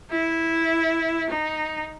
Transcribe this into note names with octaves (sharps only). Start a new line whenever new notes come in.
E4
D#4